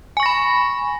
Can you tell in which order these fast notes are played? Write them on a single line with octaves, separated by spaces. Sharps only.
G#5 C#6 A#6 B5